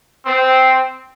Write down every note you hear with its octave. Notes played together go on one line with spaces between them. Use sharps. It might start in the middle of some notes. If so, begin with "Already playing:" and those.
C4